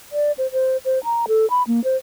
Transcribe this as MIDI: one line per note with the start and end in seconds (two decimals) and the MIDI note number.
0.12 0.32 74
0.38 0.50 72
0.52 0.77 72
0.85 1.02 72
1.04 1.25 82
1.28 1.48 69
1.50 1.63 83
1.67 1.83 58
1.84 1.97 72